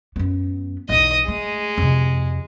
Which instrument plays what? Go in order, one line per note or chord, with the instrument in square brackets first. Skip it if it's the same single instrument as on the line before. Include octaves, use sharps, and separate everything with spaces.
[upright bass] F#2 B3
[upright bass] B1 E2 [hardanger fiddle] D#5 D#6
[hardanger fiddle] G#3 [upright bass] A3
[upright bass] F2 C3